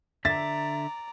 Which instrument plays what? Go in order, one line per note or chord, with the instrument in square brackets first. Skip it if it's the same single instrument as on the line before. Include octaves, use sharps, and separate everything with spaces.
[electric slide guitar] D3 E5 [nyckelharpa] D5 A#5 [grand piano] A6